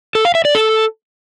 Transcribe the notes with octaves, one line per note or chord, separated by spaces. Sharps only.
A4
F5
E5
D5
A4